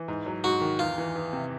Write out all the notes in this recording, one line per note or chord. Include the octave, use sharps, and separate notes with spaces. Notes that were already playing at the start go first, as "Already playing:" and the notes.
Already playing: E3
G#2
F#3
G#2 F#4
D#3
E2 F4
E3
E2
C3